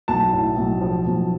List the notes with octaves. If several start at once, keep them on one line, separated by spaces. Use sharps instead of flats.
B1 A5
A2
B1
F3
B1